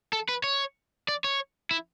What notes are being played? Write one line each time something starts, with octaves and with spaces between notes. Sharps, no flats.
A4
B4
C#5
D5
C#5
E4